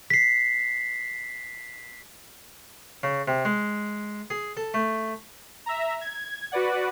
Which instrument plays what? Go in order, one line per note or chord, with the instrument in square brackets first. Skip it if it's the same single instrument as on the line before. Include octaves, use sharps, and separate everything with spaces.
[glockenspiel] B6 C7
[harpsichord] C#3
C3
G#3
G#4
A4
A3
[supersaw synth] E5 A#5
G#6
F#4 B4 D5 F#5